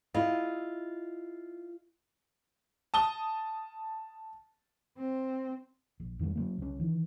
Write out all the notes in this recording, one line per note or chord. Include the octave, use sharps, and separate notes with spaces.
E4 F4 G#4 D#5
A5 D#6 G7
C4
A#1
F2 D#3 F3 G3
C#3 F#3 A#3
C2 C#4
D#3 E3